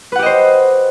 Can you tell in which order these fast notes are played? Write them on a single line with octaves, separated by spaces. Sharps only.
B4 F#5 G4 D#5 C5